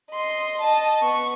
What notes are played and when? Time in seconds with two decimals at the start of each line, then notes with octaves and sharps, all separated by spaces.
0.12 D#5 C6
0.61 D#5 A5
1.01 B3 C#6